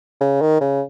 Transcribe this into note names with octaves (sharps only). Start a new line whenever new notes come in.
C#3
D#3
C#3